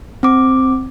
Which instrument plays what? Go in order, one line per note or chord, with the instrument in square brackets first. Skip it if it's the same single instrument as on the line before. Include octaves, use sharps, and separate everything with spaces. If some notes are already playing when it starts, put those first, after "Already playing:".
[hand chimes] C4 D6